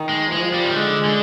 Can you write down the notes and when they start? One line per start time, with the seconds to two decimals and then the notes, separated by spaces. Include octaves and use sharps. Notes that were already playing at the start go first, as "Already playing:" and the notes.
Already playing: D#3
0.09 G#3
0.31 F3 G#3
0.54 G3
0.65 D#3
0.76 D3 G#3
1.05 D3